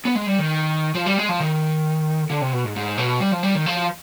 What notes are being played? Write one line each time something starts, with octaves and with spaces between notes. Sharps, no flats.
B3
G#3
G3
D#3
F3
G3
G#3
F3
D#3
D3
C3
B2
G#2
G#2
B2
G3
F3
G3
D#3
F3